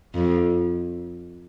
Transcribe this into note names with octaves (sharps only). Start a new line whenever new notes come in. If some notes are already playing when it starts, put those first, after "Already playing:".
F2